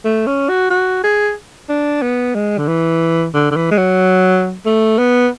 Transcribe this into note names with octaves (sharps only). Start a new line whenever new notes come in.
A3
C#4
F#4
F#4
G#4
D4
B3
G#3
D3
E3
D3
D3
E3
G#3
F#3
A3
B3